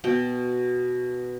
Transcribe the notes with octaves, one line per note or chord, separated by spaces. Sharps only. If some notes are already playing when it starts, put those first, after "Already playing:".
B2 G5